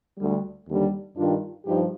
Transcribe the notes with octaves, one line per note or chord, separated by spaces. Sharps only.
D2 D3 G3
D#2 D3 G3
G2 D#3 G3 D4 F4
G2 F3 D#4 G4